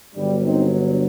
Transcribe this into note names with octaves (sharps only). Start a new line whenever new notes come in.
G1 G2 D3 F#3 G3
C4 D#4